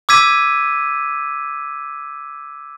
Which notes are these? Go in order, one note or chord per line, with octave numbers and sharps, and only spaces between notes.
D6 E6 G#6 B6 D#7